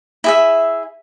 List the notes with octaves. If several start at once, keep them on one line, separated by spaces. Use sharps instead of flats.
E4 G#4 E5